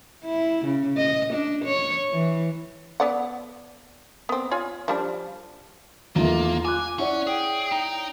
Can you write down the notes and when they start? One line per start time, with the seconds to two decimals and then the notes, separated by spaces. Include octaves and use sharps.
0.25 E4
0.66 C#3
0.98 D#5
1.34 D4
1.65 C#5
2.13 E3
3.00 B3 D5 F#5
4.29 B3 C4
4.51 F4 C#5 G#5
4.88 F3 G3 D4
6.16 E2 D#3 A3 A#3 F4
6.65 G#5 D6 F#6
6.99 C#4 E4 C#5 D5 F#5
7.27 G#4 G5
7.72 D#4